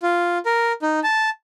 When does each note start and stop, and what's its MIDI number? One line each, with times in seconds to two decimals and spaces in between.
0.03 0.38 65
0.46 0.72 70
0.82 1.00 63
1.04 1.30 81